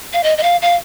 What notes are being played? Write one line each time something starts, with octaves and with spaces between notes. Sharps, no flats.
F5
D#5
D#5
F5
F5